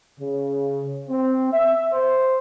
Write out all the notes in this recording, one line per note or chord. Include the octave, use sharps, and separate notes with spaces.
C#3
C4
E5
C5